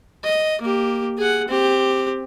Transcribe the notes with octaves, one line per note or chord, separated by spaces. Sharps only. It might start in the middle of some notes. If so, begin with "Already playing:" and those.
D#5
A#3 G4
G#4 F#5
C4 G4